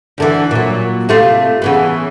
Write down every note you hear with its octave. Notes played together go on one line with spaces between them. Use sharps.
D2 D3 E3
A#2 F#3
C3 A3 F4
C#3 E3 B3